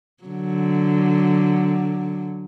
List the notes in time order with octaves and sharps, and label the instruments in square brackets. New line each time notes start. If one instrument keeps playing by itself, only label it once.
[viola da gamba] D3 F#3